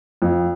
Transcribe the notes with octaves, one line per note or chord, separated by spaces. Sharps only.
F2